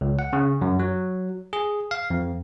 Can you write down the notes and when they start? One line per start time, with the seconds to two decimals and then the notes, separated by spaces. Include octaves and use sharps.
0.01 C#2
0.19 F#5
0.33 C#3
0.61 F#2
0.79 F#3
1.53 G#4
1.91 F5
2.10 F2